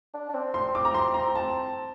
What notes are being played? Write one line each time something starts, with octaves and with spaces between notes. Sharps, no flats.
D4
D4
C4
C6
D6
A#5
C6
A#5
A5